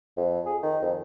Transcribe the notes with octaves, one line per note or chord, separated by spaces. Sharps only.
F2
G#4
D#3
F2